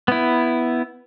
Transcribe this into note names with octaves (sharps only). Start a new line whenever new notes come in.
B3 E4